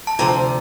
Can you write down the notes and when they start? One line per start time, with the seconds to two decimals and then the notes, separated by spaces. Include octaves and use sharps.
0.07 A5
0.19 D2 C3 F3 A#5